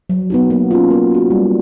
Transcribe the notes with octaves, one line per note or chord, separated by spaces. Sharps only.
F#3
B3 D#4 F#4
A#3
C#4 F4
A#3
D#4 F#4
G3